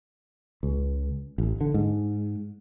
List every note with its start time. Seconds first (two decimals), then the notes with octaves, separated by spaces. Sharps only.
0.63 C#2
1.38 A1
1.61 D3
1.74 G#2